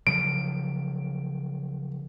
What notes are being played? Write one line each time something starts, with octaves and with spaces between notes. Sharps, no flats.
C#3 F3 F#3 D7